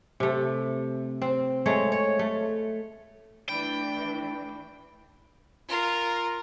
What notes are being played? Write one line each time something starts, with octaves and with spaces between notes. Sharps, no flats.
C3 A3
C4
G#3 A3 C#5
C#5
A3
E3 A3 D4 G5 B5
F4 A#4